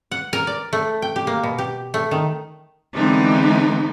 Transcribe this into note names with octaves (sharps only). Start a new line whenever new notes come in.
F#5
A#4
D5
A3
G5
G4
A#3
B2
G4
A3
D#3
D3 E3 G#3 B3 C4 D#4